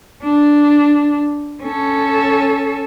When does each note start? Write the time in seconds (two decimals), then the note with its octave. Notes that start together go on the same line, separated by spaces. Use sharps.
0.23 D4
1.63 C#4 A4